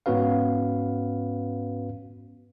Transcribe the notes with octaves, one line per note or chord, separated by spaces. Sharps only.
G#2 B3 C#4 F#4 B4 F5